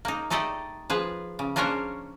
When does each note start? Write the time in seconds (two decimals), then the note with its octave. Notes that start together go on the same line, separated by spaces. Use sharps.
0.05 A#3 D#4
0.30 A3 D#4 G4 A4 D5 D#5
0.90 F3 G#4 B4
1.39 C#3
1.56 A#3 C#4 D4 A#4 C5 C#5